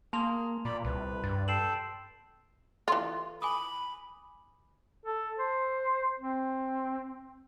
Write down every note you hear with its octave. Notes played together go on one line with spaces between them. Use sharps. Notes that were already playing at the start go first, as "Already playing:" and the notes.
A#3 G#4 A5 C6 F7
A#2 D5 B5
C2 B4
G2 A6
A4 G5 C7 E7 F#7
E3 F4 A4
G#5 B5 D6 D#6
A4
C5
C4